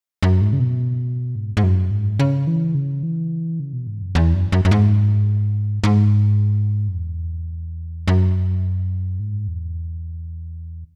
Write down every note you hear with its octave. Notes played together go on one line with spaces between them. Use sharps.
F#2
G#2
C#3
B2
G#2
G#2
F#2
G#2
C#3
E3
C#3
E3
C#3
B2
G#2
F#2
E2
F#2
F#2
F#2
G#2
G#2
F#2
E2
F#2
G#2
E2